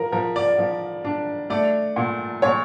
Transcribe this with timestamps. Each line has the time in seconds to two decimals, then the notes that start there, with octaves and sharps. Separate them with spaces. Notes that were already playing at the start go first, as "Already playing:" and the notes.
Already playing: F3 A#4
0.12 F3 A#4
0.36 D5
0.59 F3
1.05 D4
1.50 A3 D5
1.96 A#2
2.42 A#2 C#5